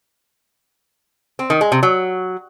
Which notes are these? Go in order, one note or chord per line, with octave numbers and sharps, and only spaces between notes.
C4
D#3
G#3
C3
F#3